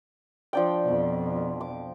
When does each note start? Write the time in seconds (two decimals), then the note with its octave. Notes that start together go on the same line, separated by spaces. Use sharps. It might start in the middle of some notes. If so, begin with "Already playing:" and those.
0.53 F3 D4 G5
0.84 F2 B2
1.61 D6